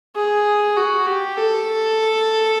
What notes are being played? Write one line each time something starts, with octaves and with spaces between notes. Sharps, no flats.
G#4
F#4
G4
A4